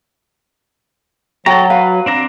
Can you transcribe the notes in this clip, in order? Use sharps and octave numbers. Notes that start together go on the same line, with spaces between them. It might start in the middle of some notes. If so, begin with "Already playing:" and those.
F#3 F#4 A4 G5 A#5
B4 F5
C4 D4 A#5